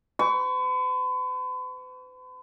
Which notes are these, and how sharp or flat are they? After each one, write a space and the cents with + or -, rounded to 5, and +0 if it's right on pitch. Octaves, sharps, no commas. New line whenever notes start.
B4 +45 C#6 +25